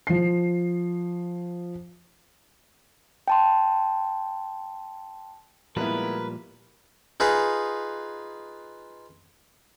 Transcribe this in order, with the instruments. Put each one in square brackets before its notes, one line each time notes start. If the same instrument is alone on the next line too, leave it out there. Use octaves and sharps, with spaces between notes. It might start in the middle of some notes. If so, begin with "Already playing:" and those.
[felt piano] F3 C7
[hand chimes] G5 A5 C6
[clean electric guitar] A#2 F3 G3 [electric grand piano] G#3 B3 E4 [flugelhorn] A#4 [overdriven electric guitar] B4
[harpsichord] D#4 F4 G#4 B4